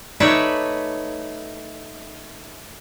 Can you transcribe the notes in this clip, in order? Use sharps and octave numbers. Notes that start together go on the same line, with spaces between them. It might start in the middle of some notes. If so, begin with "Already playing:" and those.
A3 D#4 B4 C#5 D5 E5